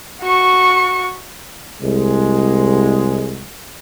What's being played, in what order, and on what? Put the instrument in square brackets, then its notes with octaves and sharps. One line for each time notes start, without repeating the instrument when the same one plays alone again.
[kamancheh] F#4 C#6
[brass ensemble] C2 G#3